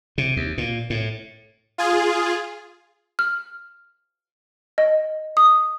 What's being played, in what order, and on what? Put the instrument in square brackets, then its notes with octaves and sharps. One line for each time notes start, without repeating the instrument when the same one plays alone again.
[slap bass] C3
D#2
A#2
A2
[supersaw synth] F4 G#4
[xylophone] F6
D#5
D#6